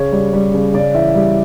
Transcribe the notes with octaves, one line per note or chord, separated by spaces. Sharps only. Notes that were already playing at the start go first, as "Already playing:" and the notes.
Already playing: C#3 C#5
G3
G3
C#3
C#3 D5
E3 E5
G3